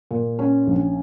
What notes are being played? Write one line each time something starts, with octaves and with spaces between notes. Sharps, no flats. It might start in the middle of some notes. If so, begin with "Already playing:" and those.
A#2
C#4
A#1